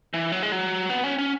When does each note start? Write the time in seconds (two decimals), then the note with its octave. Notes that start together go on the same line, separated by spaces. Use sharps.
0.14 E3
0.32 F#3
0.43 G#3
0.52 F#3
0.90 B3
1.04 C#4
1.18 C#4